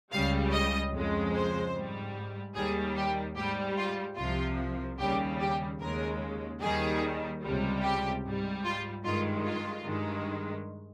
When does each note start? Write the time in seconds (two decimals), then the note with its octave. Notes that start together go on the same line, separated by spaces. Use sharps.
0.12 C#2 C#3 G3 F5
0.52 D#5
0.93 F2 C#3 G#3
1.34 C5
1.74 G#2 G3
2.55 D#2 D#3 G3 G#4
2.96 G4
3.36 G#2 G3 G4
3.78 F4
4.17 C2 C3 F3 F4
4.99 D#2 C#3 G3 G4
5.40 G4
5.80 D#2 C#3 G#3 A#4
6.61 D#2 D#3 G3 G#4
7.42 C#2 C3 G3
7.83 G4
8.24 G#2 G3
8.65 F4
9.04 G2 D#3 G#3 F4
9.45 F4
9.86 G2 D#3 G#3